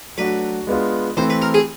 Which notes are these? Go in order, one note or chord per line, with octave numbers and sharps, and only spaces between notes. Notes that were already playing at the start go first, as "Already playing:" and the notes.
F#3 A3 D4 F#4 B4
G#3 B3 D4 F4
E3 A3 C4 C5
B4
A#4
G#4